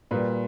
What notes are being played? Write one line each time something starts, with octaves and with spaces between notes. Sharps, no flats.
A#2 G3 B4